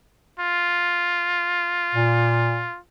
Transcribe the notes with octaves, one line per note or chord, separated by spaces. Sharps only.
F4
A#2